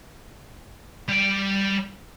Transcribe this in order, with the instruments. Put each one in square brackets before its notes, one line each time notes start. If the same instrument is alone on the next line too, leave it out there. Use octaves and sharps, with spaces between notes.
[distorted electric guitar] G3 G5